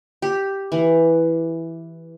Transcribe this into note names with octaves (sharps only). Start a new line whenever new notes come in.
G4
E3